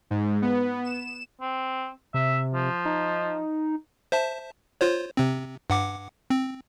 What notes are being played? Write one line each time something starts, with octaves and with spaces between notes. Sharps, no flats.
G#2
B3
E7
C4
C3 E5
F3
D#4
C5 E5 A5
F4 C5 C#5
C3 C4
G2 F#5 D6
C4